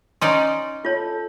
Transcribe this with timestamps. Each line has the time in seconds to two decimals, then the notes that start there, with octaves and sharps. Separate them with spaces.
0.22 C#4 D#4 D5 C6
0.85 F4 A4 C#5